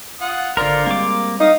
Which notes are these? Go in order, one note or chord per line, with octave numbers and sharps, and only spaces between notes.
F4 F#5 D#6
G#1 D3 F4 A#4 C5 D5 D6
G3 G#3 A#3 C4 D6
D#4 F5 D#6